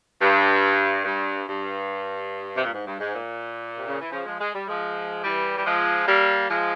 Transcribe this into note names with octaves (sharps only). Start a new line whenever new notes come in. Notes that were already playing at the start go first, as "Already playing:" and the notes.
G2
G2
G2
C3
A#2
G#2
G2
G#2
A#2
C3
C#3
E3
C#3 F3
F3 G#3
G#3
G3
F3 G#3
E3 G3
G3
F3 G#3
G3 A#3
F3 G#3